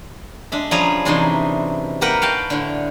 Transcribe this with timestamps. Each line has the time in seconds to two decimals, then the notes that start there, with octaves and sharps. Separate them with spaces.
0.52 G#3 D4 E5
0.71 F3 G3 C#4 G#4 A#5
1.05 F#2 C3 E3 D4 D#4 C6
2.01 A#3 G4 A#4 B4 F#5 G5
2.22 F#4 F5 G5 A5
2.50 A2 D3